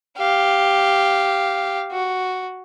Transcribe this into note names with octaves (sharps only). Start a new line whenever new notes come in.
G4 F5
F#4